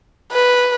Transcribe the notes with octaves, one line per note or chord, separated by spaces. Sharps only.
B4